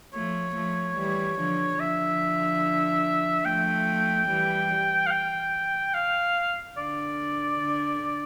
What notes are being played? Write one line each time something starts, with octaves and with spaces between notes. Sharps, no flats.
F3 A3 C#5
F3 A3
E3 G3
D3 F3
D3 F3 E5
F3 A3 G5
E3 G3
F5
G5
F5
D3 D5
D3